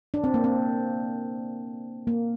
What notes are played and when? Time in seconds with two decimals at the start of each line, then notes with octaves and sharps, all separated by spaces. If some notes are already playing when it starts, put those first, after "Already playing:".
0.14 D4
0.24 C4
0.34 A#3
0.44 C4
2.07 A#3